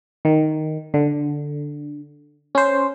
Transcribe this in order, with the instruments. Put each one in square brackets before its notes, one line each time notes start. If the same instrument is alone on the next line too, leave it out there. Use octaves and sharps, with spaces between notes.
[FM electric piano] D#3
D3
C#4 C5